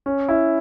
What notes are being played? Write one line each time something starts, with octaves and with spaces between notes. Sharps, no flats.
C#4
E4